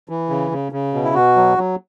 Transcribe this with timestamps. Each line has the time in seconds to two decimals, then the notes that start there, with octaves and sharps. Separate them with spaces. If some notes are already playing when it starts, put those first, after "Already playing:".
0.09 E3
0.29 C#3
0.51 C#3
0.72 C#3
0.94 B2
1.04 E4
1.15 B2 F#4
1.36 F#3
1.57 F#3